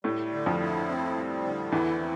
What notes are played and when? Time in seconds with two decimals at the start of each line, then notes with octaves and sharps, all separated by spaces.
0.04 A2 G3 A3
0.33 D3
0.46 F2 F3
0.61 E4
0.89 C4
1.16 G3
1.44 D3
1.72 E2 E3 E4
2.00 C4